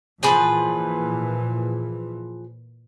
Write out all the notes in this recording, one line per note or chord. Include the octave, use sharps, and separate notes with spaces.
A#2 E3 F3 G#4 B4